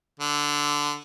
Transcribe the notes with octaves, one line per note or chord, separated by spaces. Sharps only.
D3